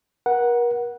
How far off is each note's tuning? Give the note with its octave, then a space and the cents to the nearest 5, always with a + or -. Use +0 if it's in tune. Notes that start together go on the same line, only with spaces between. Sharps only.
A#4 +40 F#5 +0